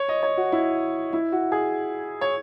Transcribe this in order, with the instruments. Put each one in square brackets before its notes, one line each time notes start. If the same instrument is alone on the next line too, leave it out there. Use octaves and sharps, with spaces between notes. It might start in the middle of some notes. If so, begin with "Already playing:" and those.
Already playing: [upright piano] C#5
D#5
C#5
F#4
E4
E4
F#4
G#4
C#5